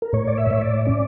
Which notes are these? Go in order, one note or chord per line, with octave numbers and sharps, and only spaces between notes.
A#4
A2 C#5
D5
E5
A2 C#5
D5
C#4 D5